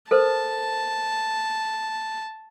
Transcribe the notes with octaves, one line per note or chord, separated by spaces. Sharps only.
A4 A#4 C5 A5